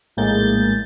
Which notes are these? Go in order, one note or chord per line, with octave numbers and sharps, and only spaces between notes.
A#1 A2 G#3 A#3 G6 A6